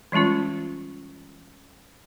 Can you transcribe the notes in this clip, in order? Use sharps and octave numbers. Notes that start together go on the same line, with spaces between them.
E3 G3 G#3 C#4 F4